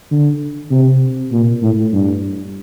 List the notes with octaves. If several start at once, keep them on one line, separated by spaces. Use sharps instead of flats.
D3
C3
A#2
A2
G2